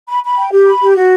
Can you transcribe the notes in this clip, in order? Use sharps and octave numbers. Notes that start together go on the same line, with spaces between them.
B5
B5
G5
G4
B5
G4
F#4